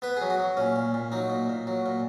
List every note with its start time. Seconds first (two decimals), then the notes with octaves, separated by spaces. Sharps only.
0.02 B3 B4
0.17 F#3 G#4
0.30 F#4
0.39 F#3
0.57 A#2 C#4
0.76 A#2
0.94 A#2
1.12 F#3 D#4
1.30 A#2
1.49 A#2
1.67 F#3
1.86 A#2